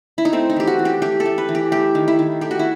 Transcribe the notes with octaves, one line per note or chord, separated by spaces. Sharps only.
E4
D#4
A3 C4
D#4
E3 G4
F#4
E3
G4
A3 G4
A4
A3
B4
E3
G4
A3 G4
D#3
E4
D#3
A3 G4
F#4
E4